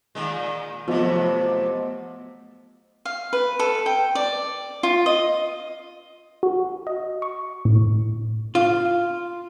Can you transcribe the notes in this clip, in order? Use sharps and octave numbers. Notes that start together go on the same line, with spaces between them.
A#2 D#3 G#3
F2 C3 F3 F#3 A3 B3 C5 D#5
F5
B4
A4
G5
D5
F4
D#5
F#4
D#5
C#6
A2
F4